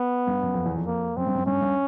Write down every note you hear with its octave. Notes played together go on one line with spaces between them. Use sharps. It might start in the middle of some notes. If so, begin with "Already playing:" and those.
Already playing: B3
G2
F#2
F2
E2
F2
A#3
F#2 C4
G2
F#2
G2 C#4
G2